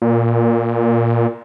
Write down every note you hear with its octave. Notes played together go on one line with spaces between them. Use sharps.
A#2